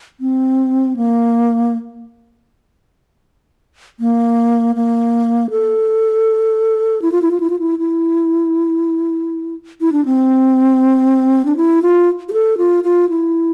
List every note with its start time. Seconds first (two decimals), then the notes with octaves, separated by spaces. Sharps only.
0.20 C4
0.97 A#3
4.00 A#3
4.76 A#3
5.50 A4
7.02 E4
7.12 F4
7.22 E4
7.31 F4
7.40 E4
7.50 F4
7.59 E4
7.79 E4
9.81 E4
9.92 D4
10.05 C4
11.45 D4
11.57 E4
11.82 F4
12.29 G4
12.33 A4
12.58 F4
12.84 F4
13.09 E4